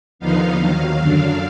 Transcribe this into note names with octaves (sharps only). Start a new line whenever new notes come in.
D#2 D3 F3 B3 D#4 F5
D#2 D#3 F#3
F#2 D3 F#3 D4